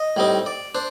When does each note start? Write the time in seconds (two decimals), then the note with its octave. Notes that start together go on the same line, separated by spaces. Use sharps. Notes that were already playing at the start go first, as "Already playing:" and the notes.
Already playing: D#5
0.16 A2 G3 C4 D#4
0.46 D5
0.75 D4 C5